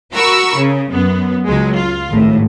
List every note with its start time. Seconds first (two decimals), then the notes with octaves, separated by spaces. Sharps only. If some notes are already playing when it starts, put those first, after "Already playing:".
0.14 F#4 A#4 B5 C#6 E6
0.57 C#3
0.92 F#2 B3
1.47 C#2 F#3 G#3
1.78 F4
2.09 G#1 A2